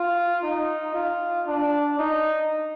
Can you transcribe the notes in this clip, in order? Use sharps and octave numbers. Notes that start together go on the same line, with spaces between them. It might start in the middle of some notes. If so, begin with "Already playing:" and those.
Already playing: F4
D#4
F4
D4
D#4